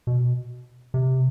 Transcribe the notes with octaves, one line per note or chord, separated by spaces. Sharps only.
B2
C3